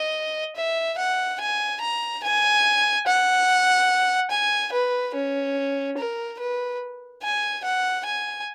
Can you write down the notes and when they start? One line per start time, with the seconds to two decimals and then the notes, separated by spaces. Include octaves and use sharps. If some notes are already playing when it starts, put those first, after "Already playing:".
Already playing: D#5
0.56 E5
0.98 F#5
1.40 G#5
1.81 A#5
2.24 G#5
3.07 F#5
4.31 G#5
4.72 B4
5.15 C#4
5.97 A#4
6.39 B4
7.22 G#5
7.64 F#5
8.05 G#5